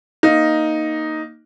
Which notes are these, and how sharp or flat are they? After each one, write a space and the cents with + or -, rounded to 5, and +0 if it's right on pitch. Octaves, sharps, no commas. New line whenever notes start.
A#3 +0 D#4 +0